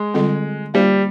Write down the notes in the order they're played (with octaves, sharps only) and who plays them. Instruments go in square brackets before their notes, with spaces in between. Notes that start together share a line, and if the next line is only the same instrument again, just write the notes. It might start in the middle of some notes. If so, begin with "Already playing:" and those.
Already playing: [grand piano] G#3
[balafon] D3 G3 C4 F4 G#4
[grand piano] G3 [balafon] A#3 D4 F4 C5